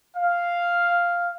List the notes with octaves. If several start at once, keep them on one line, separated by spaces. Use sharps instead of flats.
F5